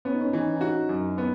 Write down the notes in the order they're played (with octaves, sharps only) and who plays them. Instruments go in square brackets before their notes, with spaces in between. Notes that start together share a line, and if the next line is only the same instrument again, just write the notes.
[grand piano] B3 [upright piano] C#4
[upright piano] D#4
C#4
[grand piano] E3 [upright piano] D#4
[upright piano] D#4
[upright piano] E4 [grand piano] F#4
[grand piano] F#2
B3